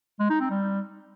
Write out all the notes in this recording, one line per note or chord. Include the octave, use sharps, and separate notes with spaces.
G#3
D#4
C4
G3